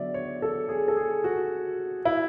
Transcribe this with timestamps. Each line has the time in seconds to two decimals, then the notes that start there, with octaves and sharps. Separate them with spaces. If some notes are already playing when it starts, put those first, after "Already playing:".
Already playing: D3 F#3 B3 D5 E5
0.14 C#5
0.42 A4
0.69 G#4
0.88 A4
0.97 G#4
1.24 F#4
2.05 E4